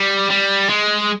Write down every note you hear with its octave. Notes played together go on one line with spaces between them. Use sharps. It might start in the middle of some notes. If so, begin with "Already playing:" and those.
Already playing: G3
G3
G#3